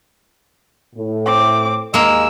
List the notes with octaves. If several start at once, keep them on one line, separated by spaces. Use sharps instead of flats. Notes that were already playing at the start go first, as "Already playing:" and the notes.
A2
C4 D6
D#2 G#3 A#3 D#5 E6